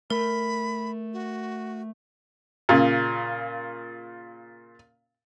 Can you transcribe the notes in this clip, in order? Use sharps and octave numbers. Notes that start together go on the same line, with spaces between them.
A3 A#4 B5
F#4
A#2 C#3